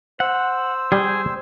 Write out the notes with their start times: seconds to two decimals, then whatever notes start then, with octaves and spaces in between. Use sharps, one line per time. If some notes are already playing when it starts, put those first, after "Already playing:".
0.20 C5 F#5 E6
0.92 G3 G#4 G5